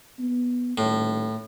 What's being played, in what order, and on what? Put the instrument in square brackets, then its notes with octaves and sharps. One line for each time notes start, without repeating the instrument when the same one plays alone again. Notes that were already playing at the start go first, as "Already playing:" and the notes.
[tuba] B3
[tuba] D#1 [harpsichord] A2